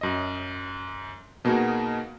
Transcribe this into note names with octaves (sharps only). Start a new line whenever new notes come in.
F#2 D#5
B2 A#3 B3 D#4 F#4 G#4